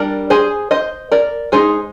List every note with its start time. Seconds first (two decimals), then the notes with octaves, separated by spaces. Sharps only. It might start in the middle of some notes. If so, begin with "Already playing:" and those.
Already playing: G3 D4 A#4 D5
0.30 G#4 C5
0.71 C5 D#5
1.12 A#4 D5
1.52 G#3 D#4 G#4 C5